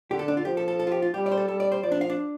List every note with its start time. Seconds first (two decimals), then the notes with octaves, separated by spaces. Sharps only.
0.11 D3 G4
0.19 A4
0.28 D4
0.37 F4
0.45 F3 G4
0.57 A4
0.68 A4
0.79 A4
0.87 F4
0.92 G4
1.02 F4
1.14 G3 G4
1.26 D5
1.32 C5
1.37 A4
1.48 G3 A4
1.60 D5
1.72 C5
1.83 F3 D5
1.92 D4
2.01 F5
2.10 D4